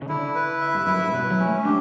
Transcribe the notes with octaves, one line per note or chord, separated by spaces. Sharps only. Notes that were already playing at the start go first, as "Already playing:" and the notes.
C#3
D3 E4
B4
E5
G2
F#2 E4
G2
B2 B4
F#3
C#4
A3
D4 G4